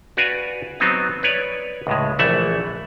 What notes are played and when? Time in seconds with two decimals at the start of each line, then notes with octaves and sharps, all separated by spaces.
0.17 F#4 B4 D5 F5 G#5
0.80 F#3 B3 C4 D#4
1.23 B4 C#5 D5
1.87 C#2 A2 G#3
2.19 A#1 E3 A3 E5 F#5